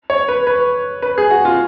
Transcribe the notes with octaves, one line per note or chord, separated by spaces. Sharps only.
C#5
B4
B4
B4
G#4
F#4
F4